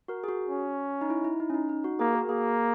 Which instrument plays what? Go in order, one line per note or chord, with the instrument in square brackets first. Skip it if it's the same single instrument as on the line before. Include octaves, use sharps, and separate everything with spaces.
[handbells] F#4 A#4
G#4
F#4
[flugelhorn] C#4
[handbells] D#4
E4
E4
D#4
C#4
D#4
D#4
F#4
[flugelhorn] A#3 [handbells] G#4
[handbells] F#4 A#4
[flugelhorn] A#3 [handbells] G#4